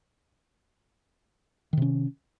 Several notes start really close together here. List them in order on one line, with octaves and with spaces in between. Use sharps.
D#3 C3 C#4